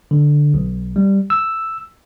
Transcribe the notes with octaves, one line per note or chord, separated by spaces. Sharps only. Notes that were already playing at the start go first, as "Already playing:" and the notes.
D3
B1
G3
E6